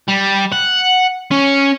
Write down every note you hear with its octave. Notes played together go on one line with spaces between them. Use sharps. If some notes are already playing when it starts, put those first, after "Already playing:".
G3
F#5
C#4